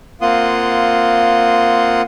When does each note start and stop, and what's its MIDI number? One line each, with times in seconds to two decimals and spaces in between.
0.21 2.02 58
0.21 2.02 60
0.21 2.02 65
0.21 2.02 78
0.21 2.02 84
0.21 2.02 87